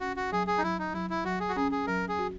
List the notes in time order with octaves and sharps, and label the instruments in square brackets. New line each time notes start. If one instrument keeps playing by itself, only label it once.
[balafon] C#4 [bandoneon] F#4
[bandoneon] F#4
[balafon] F#3 [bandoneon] G#4
[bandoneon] G#4
D#4
[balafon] F#3 [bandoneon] E4
[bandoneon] D#4
[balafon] F#3 [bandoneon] E4
[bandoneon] E4
[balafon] F#3 [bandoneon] F#4
[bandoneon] G#4
F#4
[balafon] C#4 [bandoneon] G#4
[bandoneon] G#4
[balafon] F#3 [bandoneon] A#4
[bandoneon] G#4
[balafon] F#4